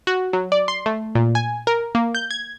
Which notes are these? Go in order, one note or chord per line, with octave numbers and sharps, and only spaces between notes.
F#4
F#3
D5
C6
A3
A#2
G#5
A#4
A#3
G6
G#6